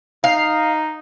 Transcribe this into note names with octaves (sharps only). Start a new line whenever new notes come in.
D#4 F5